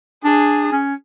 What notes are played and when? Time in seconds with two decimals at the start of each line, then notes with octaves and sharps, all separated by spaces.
0.25 D4 G#4
0.73 C#4